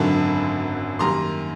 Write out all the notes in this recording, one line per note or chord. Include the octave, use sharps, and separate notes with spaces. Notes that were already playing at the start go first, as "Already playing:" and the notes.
Already playing: G#1 F#2 D3 F#3 A5 B5
F#2 D#3 G3 A#3 A#5 C6